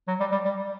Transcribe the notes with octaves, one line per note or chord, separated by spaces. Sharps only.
F#3
G3
G3
G3